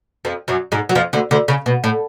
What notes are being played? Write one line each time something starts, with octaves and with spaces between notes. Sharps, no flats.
F2 F3
F#2 F#3
G#2 G#3
F#3
F2 F3
D2 D3
D2 D3
C#3
B2
A2